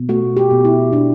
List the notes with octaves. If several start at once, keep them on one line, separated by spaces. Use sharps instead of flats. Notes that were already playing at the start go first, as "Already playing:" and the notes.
Already playing: B2
A3 F#4
G4
B2
E4
B2 D4